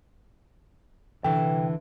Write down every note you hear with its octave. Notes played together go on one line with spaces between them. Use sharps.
C2 D3 E3 A4 G5